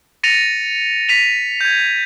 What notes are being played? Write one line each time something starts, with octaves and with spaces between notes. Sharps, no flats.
A6 A#6 C#7 D#7 F7
B6 D#7 F7
G6 G#6